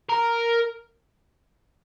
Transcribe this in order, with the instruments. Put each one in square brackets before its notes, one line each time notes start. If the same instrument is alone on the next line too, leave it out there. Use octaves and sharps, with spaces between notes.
[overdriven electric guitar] A#4